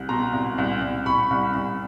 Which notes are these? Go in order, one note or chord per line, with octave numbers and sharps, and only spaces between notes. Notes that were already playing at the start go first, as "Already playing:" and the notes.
Already playing: C2
B2 A#5 C6
C2
C2
C2
C2 B5 C#6
C2
C2